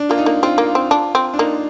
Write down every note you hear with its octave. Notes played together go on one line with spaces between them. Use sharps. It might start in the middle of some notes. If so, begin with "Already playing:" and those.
Already playing: D4
A#3 F4
D#4
A#3
C4 F4
A#3
C4
D4
C4
D4
A#3 D#4